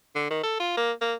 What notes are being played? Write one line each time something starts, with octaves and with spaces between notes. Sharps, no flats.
D3
D#3
A4
F4
A#3
A#3